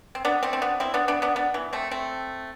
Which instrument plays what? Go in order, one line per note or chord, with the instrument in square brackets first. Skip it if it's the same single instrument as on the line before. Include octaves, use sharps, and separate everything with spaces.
[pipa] C4
B3 D4
A3 C4
C4
B3 D4
C4 E4
B3 D4
B3 D4
B3 D4
B3 D4
E3
A3 C4
A3 C4